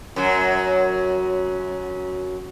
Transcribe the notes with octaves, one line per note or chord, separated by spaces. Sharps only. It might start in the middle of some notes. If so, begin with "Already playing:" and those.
F#2 F#3